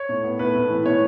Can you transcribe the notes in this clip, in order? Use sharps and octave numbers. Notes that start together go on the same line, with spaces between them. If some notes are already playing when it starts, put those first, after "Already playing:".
Already playing: C#5
A2
B3
A2 B4
A2
E3
A2 C#5